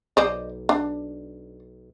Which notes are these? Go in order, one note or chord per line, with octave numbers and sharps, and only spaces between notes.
B1 C5 D5 D#5
D4